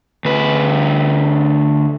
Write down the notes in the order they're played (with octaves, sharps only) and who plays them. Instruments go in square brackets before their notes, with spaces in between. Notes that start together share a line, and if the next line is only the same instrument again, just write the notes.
[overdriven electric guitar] D2 B4